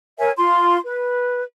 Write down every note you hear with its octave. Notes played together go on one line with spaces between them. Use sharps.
A#4 C#5 E5 G#5
F4 C6
B4